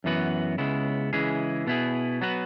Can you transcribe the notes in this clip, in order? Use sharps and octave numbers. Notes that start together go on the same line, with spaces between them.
F#2 E3 B3 F#4 B4
C#2 C#3 G#3 B3 E4
C#3 E3 G#3 E4 G#4
B2 B3 E4 G#4
F#3 B3 F#4 B4